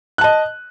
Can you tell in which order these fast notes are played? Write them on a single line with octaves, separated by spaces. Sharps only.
F#6 A5 D#5